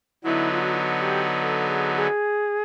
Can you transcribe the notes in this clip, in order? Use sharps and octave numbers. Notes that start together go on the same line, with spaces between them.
D3 F#3 B3 D#4 E4
F4
F#4
F4
F#4
G4
A4
G#4
G#4